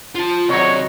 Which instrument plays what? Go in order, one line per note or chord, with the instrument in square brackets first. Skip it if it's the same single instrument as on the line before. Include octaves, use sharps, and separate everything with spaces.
[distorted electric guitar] F4 A5
[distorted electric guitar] C3 G#4 [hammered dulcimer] D#3 F#3 [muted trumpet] C#5